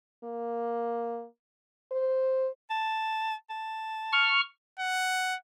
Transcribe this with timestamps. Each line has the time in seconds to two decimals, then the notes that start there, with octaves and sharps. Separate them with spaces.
0.24 A#3
1.92 C5
2.70 A5
3.50 A5
4.12 C#6 F6
4.79 F#5